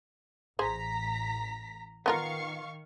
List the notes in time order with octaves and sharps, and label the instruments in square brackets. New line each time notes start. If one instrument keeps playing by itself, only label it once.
[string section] A1 A#5 B6 [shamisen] G#4 C5
[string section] D#3 F5 C#6 [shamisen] B3 F4 A#4